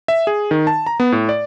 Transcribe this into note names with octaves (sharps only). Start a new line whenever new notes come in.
E5
G#4
D#3
A5
A#5
B3
A2
D5